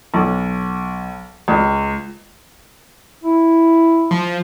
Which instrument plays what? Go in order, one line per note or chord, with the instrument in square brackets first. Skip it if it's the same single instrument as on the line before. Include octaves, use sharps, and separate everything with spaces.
[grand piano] B1
C#2
[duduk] E4
[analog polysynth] F3